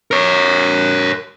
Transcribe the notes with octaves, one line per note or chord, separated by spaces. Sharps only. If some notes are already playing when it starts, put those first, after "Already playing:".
A#4 C#5